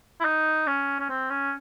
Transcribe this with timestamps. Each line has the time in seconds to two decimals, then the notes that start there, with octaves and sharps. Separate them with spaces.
0.20 E4
0.25 D#4
0.67 C#4
1.00 C#4
1.09 C4
1.30 C#4